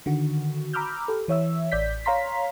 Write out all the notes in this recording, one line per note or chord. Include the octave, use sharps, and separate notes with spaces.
D3 D#3 F#4
A#5 B5 D6 E6 F6 G6
G4 A4
E3 C#5 E5 E6
A1 D5 G6 B6
C#5 F5 A#5 C6 B6